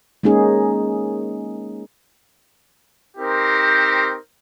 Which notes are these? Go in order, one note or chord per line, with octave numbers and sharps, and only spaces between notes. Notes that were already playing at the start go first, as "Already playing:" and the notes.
G#3 A#3 C#4 D#4 G#4
C4 D#4 G4 A#4 C5